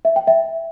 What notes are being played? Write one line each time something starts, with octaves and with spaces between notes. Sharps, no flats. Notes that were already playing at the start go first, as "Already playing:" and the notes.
E5
G5
E5